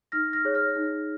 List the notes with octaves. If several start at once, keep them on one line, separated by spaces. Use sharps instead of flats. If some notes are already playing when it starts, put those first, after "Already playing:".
D#4 F6 A#6
F6 A#6
G#4 C#5
F6 A#6
D#4